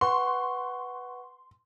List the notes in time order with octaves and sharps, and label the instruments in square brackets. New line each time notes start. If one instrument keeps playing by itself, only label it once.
[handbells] B4 F#5 C#6 [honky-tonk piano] C6